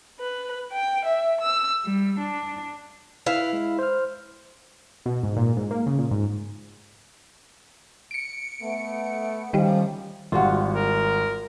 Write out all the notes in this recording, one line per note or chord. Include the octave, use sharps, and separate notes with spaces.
B4
G5
E5
E6
G3
D4
E4 B4 F5
G#3
C5 F6
B2
G#2
A#2
G#2
A#3
C#3
A#2
G#2
C#7 D7
A3 B3
A2 D#3 F3 G3 C#4
G#1 G3 F4 F#4 F#5
A#4